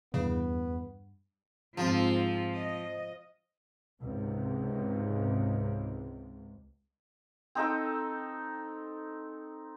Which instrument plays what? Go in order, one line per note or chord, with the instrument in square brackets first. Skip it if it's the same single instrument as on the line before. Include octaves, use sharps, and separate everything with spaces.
[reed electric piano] E2 [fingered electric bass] G2 [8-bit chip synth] C#3 [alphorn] B3
[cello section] G#2 C4 F4 [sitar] F3
[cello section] D#5
[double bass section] C#2 G#2 C3
[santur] C4 D#4 A4 G5